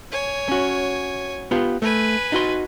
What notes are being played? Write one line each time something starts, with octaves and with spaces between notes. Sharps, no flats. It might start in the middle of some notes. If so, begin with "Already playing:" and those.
C#5 G#5
C#4 F#4
B3 F4 G4
A3 B4 G#5
D#4 F#4 C6